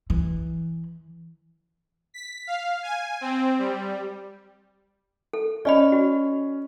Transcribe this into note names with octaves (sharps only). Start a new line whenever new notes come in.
E3
B6
F5
G#5
C4
G3
A4
C#4 D5 D#5 B5
F#4